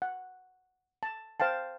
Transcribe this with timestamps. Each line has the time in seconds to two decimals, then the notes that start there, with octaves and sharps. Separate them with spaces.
0.02 F#5
1.03 A5
1.40 C5 F5 G5 A5